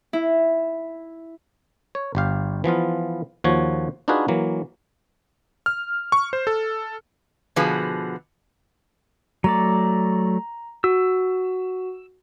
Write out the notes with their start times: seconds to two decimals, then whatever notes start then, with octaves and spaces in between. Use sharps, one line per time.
0.13 E4
1.95 C#5
2.15 G1 G4 F5
2.64 E3 F3 B3 F4
3.44 D#2 F3 F#4 C#5
4.08 D4 D#4 F4 F#4 G#4 B4
4.28 E3 F#3 A#3
5.66 F6
6.12 C#6
6.33 C5
6.47 A4
7.56 B2 D3 F3 B3 F#4 G#4
9.44 F#3 A3 D5 A#5
10.84 F#4 E6